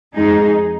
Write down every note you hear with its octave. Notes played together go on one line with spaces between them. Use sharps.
F2 F3 G#3 D#4 G#4